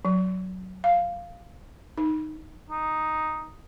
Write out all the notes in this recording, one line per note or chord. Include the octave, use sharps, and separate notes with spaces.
F#3
F5
D#4
D#4